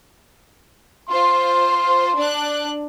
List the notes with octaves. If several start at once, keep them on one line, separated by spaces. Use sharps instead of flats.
F4 C5 C6
D4 F#6